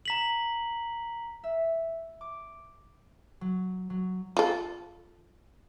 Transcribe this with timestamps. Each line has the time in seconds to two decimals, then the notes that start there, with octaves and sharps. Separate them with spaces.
0.05 A#5 B6 F#7
1.44 E5
2.21 D6
3.41 F#3
3.90 F#3
4.37 F4 A4